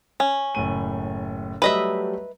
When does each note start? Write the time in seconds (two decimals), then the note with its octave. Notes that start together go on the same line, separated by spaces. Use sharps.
0.20 C#4
0.55 F#1 A2 D#7
1.62 F#3 G3 A3 B4 D#5 E5